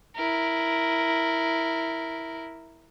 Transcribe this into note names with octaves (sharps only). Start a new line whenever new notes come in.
E4 A#4